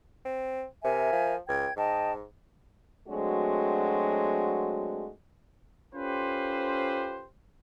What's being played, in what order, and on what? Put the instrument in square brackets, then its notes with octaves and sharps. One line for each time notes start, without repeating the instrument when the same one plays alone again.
[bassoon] C4
[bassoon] C3 [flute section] A#4 E5 G#5
[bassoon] F3
[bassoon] C#2 [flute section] G5 G#6
[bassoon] G#2 [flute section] D#5 G5 A5
[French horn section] F#3 G#3 A3 C4 D4 F#4
[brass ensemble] C#4 F4 G4 A4 B4 C5